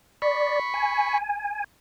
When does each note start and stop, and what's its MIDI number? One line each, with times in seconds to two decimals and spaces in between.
0.22 0.59 74
0.22 1.18 83
0.22 1.18 85
0.74 1.64 80